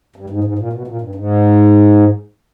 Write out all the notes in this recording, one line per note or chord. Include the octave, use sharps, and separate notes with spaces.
G2
G#2
G#2
A#2
B2
A#2
G2
G#2